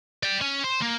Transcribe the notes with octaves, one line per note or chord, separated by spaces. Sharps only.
D5 G5
C#4
C5
A#3